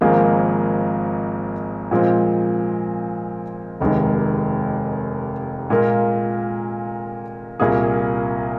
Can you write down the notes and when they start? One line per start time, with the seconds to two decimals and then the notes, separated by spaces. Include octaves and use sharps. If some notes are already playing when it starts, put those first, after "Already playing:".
0.01 G#1 G#2 F3 A#3 G#4
1.91 A#2 F3 G#3 C4
3.80 F1 D#2 D#3 G#3
5.70 A#2 G#3 F4 A#4
7.60 C2 A#2 A#3 G#4